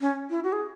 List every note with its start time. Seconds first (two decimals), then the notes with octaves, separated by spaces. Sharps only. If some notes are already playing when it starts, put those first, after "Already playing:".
0.01 C#4
0.30 E4
0.44 F#4
0.53 G#4